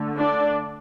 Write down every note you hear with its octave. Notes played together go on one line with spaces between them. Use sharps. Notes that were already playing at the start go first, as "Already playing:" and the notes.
Already playing: D3 A3
D4 D5